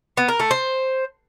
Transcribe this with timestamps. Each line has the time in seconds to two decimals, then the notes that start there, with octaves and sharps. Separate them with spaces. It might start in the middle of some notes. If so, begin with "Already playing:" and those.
0.17 B3
0.29 A#4
0.40 A3
0.51 C5